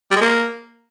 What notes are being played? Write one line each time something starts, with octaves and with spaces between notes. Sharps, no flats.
G3
G#3
A#3